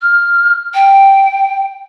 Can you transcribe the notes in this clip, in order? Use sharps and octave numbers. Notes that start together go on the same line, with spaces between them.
F6
G5